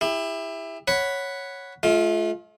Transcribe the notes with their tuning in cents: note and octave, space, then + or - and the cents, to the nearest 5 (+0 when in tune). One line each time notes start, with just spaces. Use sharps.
E4 +0 G4 +35
C#5 +0 F#5 +0 B5 +0
A3 -45 F4 +0